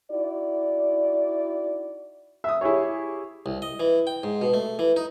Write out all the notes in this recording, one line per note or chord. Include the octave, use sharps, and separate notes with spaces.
D#4 E4 F#4 D5
E5 D#6
E4 G4 G#4 C#5
C2
D#5
E3
G5
G#2
B2
A3
E3
D#4